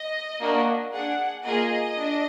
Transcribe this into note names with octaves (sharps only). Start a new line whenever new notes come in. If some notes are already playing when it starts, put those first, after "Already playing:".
Already playing: D#5
A#3 D4 F#4
D4 G#4 F#5
A#3 F4 G#4 D#5
D4